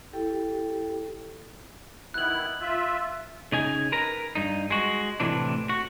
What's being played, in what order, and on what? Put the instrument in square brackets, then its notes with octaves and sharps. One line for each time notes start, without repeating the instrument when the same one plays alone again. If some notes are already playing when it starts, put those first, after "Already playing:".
[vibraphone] E4 G4 A4 G5
[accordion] D#3 B3 E4 [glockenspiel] F#6 F#7
[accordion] F4 E5
[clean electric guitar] C#3 D#4 G#5
A#4 B4 A#5
G2 D#4
G#3 F#4
A2 C3 E3 D4
F#4